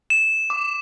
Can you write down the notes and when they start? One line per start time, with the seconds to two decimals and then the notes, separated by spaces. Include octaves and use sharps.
0.10 E7
0.50 D6